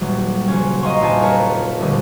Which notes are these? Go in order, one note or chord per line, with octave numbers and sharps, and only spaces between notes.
D#1 F#3 G3
C#3 F3 F#3 C#4
D#5 F5 A#5 C6 C#6
D#1 C2 F2 D4 G#5 A5
A#4 B4 C#5 A5 A#5
F1 C2 A#2 D3